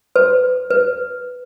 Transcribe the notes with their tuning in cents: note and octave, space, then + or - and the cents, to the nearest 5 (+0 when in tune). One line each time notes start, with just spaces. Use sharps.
B4 +35
B4 +10